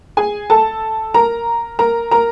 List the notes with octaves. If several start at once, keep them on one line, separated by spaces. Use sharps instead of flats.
G#4 G#5
A4 A5
A#4 A#5
A#4 A#5
A#4 A#5